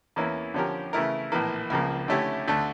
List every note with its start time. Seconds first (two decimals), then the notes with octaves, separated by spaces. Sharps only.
0.16 E2 E3 A#3 C#4 E4
0.54 D3 F3 C#4 G4 A#4
0.93 C#3 E3 A3 E4 A#4
1.32 A#1 A2 E3 A#3
1.70 C#2 C#3 F3 A#3
2.08 D3 A3 C#4 E4 G4
2.47 D2 D3 A3